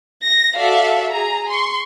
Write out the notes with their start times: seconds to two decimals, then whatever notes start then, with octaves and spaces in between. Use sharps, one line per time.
0.23 A#6
0.55 F#4 A4 D5 E5 F5
1.11 G#4 A#5
1.50 C6 C#6